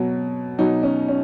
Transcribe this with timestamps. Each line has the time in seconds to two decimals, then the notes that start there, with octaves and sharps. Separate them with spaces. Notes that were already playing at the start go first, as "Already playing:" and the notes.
Already playing: B2 F#3
0.58 B2 F#3 D#4
0.83 C#4
1.08 C#4